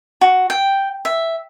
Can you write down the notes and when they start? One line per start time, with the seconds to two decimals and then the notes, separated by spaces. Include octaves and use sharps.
0.21 F#4
0.50 G5
1.05 E5